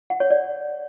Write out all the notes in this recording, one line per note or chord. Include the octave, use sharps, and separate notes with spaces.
F#5
C#5
D5